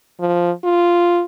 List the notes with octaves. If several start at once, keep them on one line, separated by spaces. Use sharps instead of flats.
F3
F4